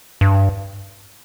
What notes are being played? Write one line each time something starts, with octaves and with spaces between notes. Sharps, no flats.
G2